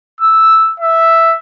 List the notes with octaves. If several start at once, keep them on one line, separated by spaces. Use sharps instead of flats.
E6
E5